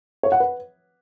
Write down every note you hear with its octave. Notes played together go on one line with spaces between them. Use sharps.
C#5
F#5
B4